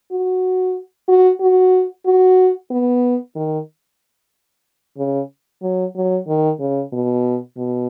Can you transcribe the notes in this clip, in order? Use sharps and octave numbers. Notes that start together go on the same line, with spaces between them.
F#4
F#4
F#4
F#4
B3
D#3
C#3
F#3
F#3
D#3
C#3
B2
B2